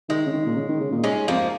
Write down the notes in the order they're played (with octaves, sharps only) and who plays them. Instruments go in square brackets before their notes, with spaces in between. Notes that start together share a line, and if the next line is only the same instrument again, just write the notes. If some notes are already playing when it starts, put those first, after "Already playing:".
[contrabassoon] D#3 [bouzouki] G#3
[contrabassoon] C#3
D#3
A#2
C#3
D#3
C#3
A#2
[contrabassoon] G#2 [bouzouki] G#3 C#4
[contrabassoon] F2 [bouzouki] F3 A#3